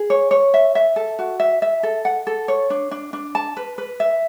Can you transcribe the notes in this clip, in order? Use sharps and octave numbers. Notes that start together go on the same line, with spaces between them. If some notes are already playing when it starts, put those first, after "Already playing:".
Already playing: G#4
C#5
C#5
E5
E5
A4
F#4
E5
E5
A4
F#5
A4
C#5
D4
D4
D4
A5
B4
B4
E5